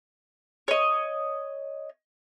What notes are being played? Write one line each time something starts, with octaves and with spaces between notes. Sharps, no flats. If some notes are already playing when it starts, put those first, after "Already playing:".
C#5 D#5